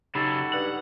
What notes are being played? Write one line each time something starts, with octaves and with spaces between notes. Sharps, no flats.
C#3 F#3 D#4 F#4 G4 A4 B5
G2 F#5